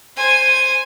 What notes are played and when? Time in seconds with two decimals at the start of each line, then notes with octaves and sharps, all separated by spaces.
0.16 C5 G#5